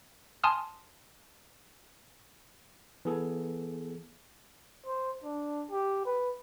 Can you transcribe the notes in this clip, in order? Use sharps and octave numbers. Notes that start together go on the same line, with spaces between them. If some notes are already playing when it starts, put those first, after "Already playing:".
G#5 A5 C6 D#6 F6
E3 B3 G#4 A4
C5
D4
G4
B4